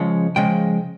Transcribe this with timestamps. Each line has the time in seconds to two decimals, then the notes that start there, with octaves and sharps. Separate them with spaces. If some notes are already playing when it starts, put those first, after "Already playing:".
Already playing: C#3 F3 G#3 C#4
0.36 C#3 F3 G#3 G5